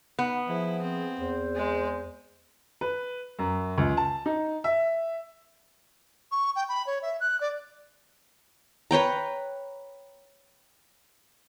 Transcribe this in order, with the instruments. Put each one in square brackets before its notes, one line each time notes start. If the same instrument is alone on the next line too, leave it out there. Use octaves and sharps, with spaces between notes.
[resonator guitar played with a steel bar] B3 [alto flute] D#4
[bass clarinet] F3 [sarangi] E4 [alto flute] G#4
[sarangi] C4
[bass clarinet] E2 [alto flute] C5
[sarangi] G#3
[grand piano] B4
F#2
C#2
A5
D#4
E5
[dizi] C#6
G5
B5
C#5
E5
F#6
D5
[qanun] B4 C#5 G5 A#5